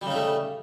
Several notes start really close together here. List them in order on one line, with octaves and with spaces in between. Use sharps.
G3 C#3 D#4 A3